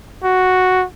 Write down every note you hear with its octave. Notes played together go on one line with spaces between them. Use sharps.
F#4